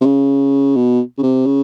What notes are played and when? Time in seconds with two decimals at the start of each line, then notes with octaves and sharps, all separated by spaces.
0.01 C3
0.05 C#3
0.76 B2
1.18 C#3
1.23 C3
1.46 C#3